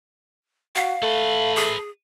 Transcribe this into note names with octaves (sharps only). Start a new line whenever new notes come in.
F#4 F5
A3 A4 B4
G#4